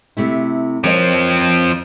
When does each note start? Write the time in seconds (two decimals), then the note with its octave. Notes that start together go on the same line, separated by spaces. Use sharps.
0.17 C3 A3 E4
0.84 F3 C4 A#4 C#5 D#5